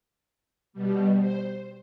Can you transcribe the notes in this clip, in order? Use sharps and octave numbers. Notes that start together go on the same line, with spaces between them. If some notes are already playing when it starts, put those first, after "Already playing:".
B2 G3
C5